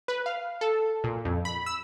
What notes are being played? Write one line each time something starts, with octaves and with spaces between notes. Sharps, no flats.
B4
F5
A4
A#2
F2
B5
E6